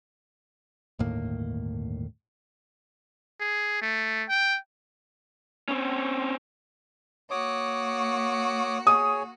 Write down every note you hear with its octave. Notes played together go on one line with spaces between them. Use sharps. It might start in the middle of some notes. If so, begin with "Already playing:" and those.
G1 D#2 A2 A#3
G#4
A3
G5
C4 C#4
A#3 F#4 C#5 D6 D#6
G#4 C#5 D#6